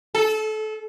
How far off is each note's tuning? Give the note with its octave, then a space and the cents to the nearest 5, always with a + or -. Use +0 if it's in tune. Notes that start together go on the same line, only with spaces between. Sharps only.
A4 -25